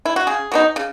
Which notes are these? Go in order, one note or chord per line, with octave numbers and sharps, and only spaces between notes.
E4
F#4
C#3 G#4
F#3 B3 D#4
C#3